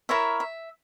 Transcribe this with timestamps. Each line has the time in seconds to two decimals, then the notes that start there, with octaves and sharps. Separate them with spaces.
0.09 E4 A#4 C#5 E5
0.40 E5